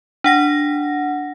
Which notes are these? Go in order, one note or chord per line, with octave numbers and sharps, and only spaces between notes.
D4 F#5 A#6